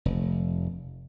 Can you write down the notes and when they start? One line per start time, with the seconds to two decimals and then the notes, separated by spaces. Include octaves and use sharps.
0.05 F1